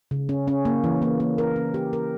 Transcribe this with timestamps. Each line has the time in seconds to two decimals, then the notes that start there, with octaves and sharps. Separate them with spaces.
0.11 C#3
0.29 C#4
0.48 C#4
0.65 A#3
0.84 E3
1.02 A#3
1.20 A#3
1.38 A#4
1.56 C#4
1.74 G4
1.93 A#4